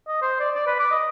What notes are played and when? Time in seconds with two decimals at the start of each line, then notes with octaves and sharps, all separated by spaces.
0.07 D#5
0.22 C5
0.40 D5
0.55 D5
0.67 B4
0.79 D6
0.91 D#5